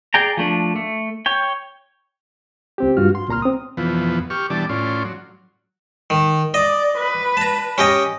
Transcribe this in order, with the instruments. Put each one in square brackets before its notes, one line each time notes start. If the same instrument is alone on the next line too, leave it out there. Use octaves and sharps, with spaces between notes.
[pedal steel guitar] G#4 D5 G5 A#5
F3 A3 D4
A3
C#5 G5
[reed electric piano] C#2 C4 G4
G2 F4 F#4 F6
C6
C2 A#2 A#5 C6 F6
C4 D#6
[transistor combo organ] F2 B2 E3 F3 B3
G4 C#6 F6
B2 E3 G3 D4 D5 A5
A2 C#4 F4 D5 C6
F#3
[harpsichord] D#3
[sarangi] D5 [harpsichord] D#5
[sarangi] B4
[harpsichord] A5 A#5
C#4 G4 D#5